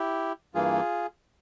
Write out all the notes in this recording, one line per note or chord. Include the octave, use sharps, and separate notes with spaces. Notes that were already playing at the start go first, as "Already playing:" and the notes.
Already playing: E4 G4
G2 E3 A#3 F4 G#4